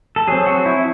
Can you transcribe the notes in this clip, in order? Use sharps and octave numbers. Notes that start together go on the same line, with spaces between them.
A4
F#3 C4 G#4
F#4
E4